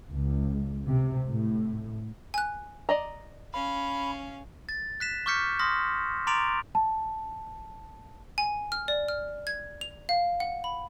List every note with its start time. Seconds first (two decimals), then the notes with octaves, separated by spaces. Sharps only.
0.11 C#2
0.86 C3
1.27 A2
2.34 G#5 F#6
2.89 D5 D#5 A#5
3.54 C#4 F5 B5
4.69 A6
5.00 F#6 B6 E7
5.26 C#6 D6 F6 G6 B6 C#7
5.59 C6 D#6 F6 A#6
6.27 A#5 C6 D6 A6 D7 F7
6.75 A5
8.38 G#5
8.72 F6
8.88 D5
9.08 F6
9.47 G#6
9.81 F7
10.09 F5
10.40 F#5
10.64 B5